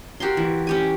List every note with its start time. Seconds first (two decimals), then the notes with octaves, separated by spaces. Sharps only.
0.20 F#4 G4 A#4 C6
0.37 E3
0.67 C#4 G4 G#5